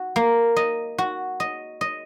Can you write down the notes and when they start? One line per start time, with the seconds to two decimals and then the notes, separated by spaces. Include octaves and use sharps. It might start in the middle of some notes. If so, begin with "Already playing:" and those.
Already playing: F#4
0.16 A#3
0.57 D#5
0.98 F#4
1.40 D#5
1.81 D#5